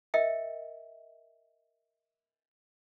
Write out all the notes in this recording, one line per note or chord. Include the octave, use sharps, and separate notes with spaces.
A#4 D#5 E5 G5